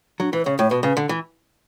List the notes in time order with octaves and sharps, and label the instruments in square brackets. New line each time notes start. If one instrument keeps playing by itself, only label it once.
[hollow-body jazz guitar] F#3 [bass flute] D4
[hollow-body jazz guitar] E3 [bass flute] B4
[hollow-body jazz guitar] C#3 [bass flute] C#5
[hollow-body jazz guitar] A2 [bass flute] C#5
[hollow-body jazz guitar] B2 [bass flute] B4
[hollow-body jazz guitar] C#3 [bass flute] B4
[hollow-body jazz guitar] D3
E3